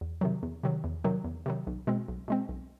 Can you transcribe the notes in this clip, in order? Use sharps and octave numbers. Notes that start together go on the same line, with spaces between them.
E2
C3 D#3 F#3
E2
C3 D#3 F#3
E2
C3 D#3 F#3
E2
C3 D#3 F#3
B1
B2 G#3 C4
B1
B2 G#3 C4
B1